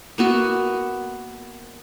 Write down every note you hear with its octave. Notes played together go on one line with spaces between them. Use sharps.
A#3 B3 F#4 E5